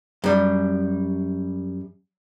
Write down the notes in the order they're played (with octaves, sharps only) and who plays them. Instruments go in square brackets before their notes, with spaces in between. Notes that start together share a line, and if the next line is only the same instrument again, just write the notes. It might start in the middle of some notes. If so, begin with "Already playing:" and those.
[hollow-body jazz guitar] F#2 G3